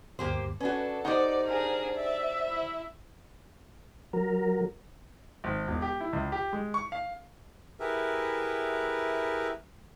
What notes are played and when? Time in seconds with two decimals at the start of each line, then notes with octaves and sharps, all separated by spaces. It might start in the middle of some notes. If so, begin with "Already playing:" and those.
0.19 D2 G2 A#3 G4 C5
0.60 C#4 D4 F#4 A4 B4
1.05 D#4 G4 C5 D5 D#5 F#5
1.47 D4 G#4 A#4
1.95 D5 E5
2.48 E4
4.13 F#3 A#4
5.44 G#1
5.67 E1
5.82 G4
6.00 E4
6.13 C#2
6.32 G4
6.53 G#3
6.74 C#6
6.92 F5
7.80 E4 G4 G#4 A#4 B4 E5